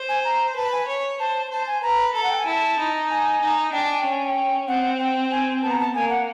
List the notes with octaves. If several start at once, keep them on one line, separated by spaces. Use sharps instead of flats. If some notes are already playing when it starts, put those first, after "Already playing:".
Already playing: C5
G#5
A#5
B4 A5
G#5
C#5
C5 A5
C5 A5
G#5
B4 A#5
A4 A#5
F#5
G5
G#5
E4 A5
D#4
G#5
D#4
D4 G5
G#5
G5
C#4
G#5
G5
C4 F#5
G5
G#5
B3 A5
A#5
A5
A#3 G#5
F#5